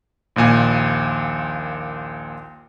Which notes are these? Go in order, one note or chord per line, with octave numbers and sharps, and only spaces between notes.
A#1 D#2 A#2 G#5